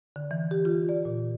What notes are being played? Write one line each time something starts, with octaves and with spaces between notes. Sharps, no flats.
D3
E3
G4
F4
D5
A#2